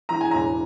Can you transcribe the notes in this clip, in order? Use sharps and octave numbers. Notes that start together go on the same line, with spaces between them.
E3 A#5
G#5
E1 A#5